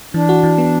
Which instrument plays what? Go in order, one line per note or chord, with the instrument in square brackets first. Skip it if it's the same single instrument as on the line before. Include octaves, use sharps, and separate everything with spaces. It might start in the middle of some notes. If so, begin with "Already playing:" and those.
[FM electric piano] E3 [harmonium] D4
[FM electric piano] F#4
E3
B3